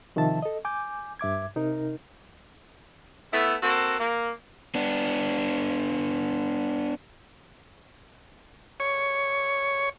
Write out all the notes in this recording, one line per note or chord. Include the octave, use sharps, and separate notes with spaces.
C3 D#3 F3 E5 A5
A4 D#5
G#5 D6 G6
G2 E5 D6 G#6
C3 D#4 A#4
A3 B3 E4 E5
A#3 C4 F#4 A4
A#3
B3 D4
C#5